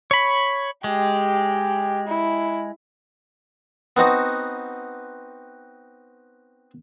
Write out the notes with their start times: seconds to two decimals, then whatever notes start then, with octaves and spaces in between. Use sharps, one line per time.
0.11 C#5 B5
0.84 G#3 G4
2.08 E4
3.97 B3 C4 D#4 F#4